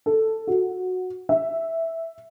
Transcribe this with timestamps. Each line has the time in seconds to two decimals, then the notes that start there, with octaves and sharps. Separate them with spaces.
0.06 A4
0.47 F#4
1.29 E5